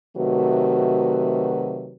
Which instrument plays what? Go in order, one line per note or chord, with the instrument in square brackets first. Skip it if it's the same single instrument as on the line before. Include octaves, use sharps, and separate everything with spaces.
[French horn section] C3 D#3 F#3 A3 F#4 B4